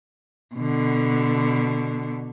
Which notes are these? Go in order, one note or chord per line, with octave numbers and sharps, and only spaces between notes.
B2 D3